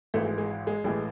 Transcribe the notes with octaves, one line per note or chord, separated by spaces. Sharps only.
G#1 G#2 E3 A3
G#3
G#3
G#3
A1 A2 E3 G#3